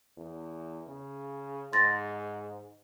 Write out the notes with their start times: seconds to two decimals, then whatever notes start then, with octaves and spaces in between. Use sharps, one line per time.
0.17 E2
0.87 C#3
1.73 G#2 C6 A6 A#6